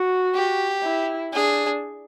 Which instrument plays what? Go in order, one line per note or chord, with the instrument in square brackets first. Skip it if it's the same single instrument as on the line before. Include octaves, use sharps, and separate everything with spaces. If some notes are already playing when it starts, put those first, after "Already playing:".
Already playing: [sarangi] F#4
[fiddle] G4
[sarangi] E4
[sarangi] D4 [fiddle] G#4